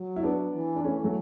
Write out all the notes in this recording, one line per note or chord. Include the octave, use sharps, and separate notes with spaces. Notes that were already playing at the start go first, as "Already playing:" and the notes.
Already playing: F#3
E4
B3 D4
E3
D4
E3 A3 C#4
F#3 A3